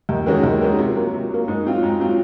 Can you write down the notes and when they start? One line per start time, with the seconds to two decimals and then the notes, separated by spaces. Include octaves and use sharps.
0.09 D#2
0.26 D#3 G#3 C#4 F#4
0.43 D#2
0.61 D#3 G#3 C#4 F#4
0.79 C3
0.96 F#3 A#3
1.13 C3
1.31 F#3 A#3
1.48 G#2
1.65 F#3 C4 F4
1.83 G#2
2.00 F#3 C4 F4